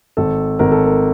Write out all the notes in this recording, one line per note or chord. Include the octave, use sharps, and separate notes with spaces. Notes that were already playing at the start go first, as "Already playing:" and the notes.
G#1 A4
G#1 A#4
A4
A#4